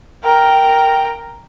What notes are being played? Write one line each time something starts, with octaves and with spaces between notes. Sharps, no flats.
A#4 G5